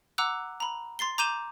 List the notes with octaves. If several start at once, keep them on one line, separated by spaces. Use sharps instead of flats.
F#5 A#5 D6 E6 F#6
A#5 B5
C6 A6 C7 G7
A#5 D6 G6 D#7 E7 G7